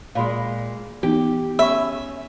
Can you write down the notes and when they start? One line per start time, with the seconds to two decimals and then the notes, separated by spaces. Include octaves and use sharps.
0.15 A#2 G#3 F5 B5 C6
1.03 E3 B3 D#4 G4
1.59 C#4 E5 B5 C#6